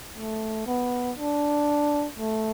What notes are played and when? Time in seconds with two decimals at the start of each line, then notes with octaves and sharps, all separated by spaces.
0.16 A3
0.67 B3
1.18 D4
2.18 A3